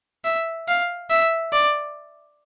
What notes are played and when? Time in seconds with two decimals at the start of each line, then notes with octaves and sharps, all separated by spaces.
0.25 E5
0.68 F5
1.11 E5
1.53 D5